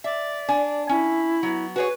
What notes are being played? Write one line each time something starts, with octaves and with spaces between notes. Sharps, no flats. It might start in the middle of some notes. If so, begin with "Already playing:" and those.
D5 E5
D4 G#5
C#4 E4
F#3 B3
F#4 G#4 B4 C#5